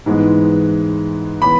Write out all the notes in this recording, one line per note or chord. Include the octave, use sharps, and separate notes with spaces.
G#2 E3 G#3 B3
E3 B3 B5